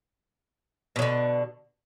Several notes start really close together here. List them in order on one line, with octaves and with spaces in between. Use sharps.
B2 F#3 D3